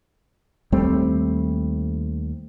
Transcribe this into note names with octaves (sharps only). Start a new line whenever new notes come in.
D#2 G3 A3 C4